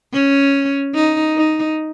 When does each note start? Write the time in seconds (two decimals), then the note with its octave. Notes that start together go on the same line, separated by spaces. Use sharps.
0.13 C#4
0.95 D#4
1.36 D#4